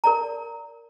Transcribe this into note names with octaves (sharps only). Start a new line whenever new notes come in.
A#4 D5 A#5